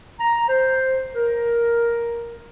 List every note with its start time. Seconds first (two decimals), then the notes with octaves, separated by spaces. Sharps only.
0.19 A#5
0.49 C5
1.14 A#4